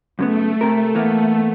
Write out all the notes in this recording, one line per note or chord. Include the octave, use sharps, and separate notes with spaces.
F#2 C#3 A3 B3
C3 A#4
E3 A#3 B3